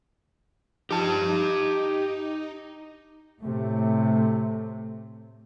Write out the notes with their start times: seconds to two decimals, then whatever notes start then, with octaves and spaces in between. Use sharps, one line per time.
0.91 F3 D#4 F4 G4 A5
1.28 D#4
3.41 A2 C3 A3